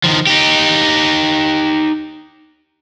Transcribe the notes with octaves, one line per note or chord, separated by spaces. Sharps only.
D#3 F3
D#4 G4